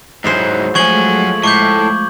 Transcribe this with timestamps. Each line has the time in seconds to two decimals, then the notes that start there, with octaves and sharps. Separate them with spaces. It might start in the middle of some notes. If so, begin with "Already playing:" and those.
0.24 G#2 F#3 E4 G#4 C5
0.75 F3 F#3 G#3 A3 G#5 C#6 G#6 F#7
1.44 A2 C#6 D6 G6